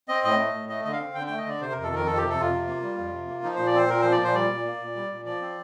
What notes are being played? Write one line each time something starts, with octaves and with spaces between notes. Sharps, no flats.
C4 D#5
A2 D#5
A3
A2
A3 D#5
D3 D#5
F5
C4
D3 G5
A3 G5
D#5
D3 D5
C3 C5
F2 A#4
A4
D#3 A#4
F2 A4
G4
C3
A4
F2 F4
C3
A#3
G3
F2
C3
A#3
F3 D#4
A#2 C5
D5
C4 C5
A#2 A#4
F3 C5
D5
A#2
C5
G3 D5
A#2
A#3
A#2
G3
A#2
F3 D5
C4